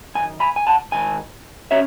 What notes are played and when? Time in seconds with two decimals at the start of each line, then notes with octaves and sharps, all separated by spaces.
0.15 F#2 D#3 G#5
0.40 G#5 B5
0.56 G#5
0.67 F#5 A5
0.92 G#2 D#3 G#5
1.71 C#4 C#5 E5